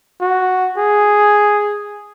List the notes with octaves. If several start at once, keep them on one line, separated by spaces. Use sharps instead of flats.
F#4
G#4